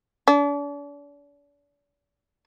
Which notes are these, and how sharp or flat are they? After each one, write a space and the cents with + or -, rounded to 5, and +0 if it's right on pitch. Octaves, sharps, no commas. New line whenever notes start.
D4 -40